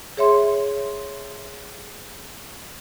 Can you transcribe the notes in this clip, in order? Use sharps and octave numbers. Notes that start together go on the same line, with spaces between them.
G#4 C#5 E5 C6